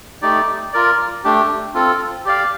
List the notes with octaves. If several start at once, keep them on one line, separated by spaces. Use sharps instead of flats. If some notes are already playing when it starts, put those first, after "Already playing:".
A3 D#4 G4 D5
F4 A#4 D5
A3 D4 G4
C4 F4 A4
G4 D5 F5